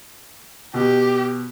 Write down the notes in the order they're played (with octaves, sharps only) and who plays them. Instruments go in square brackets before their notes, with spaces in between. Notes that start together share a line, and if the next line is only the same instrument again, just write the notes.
[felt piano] B2 [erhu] G4